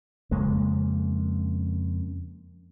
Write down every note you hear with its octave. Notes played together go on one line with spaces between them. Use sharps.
F2 C#3 G#3 A#3